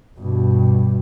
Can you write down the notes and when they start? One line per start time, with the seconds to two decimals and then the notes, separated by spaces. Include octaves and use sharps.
0.19 G2 B2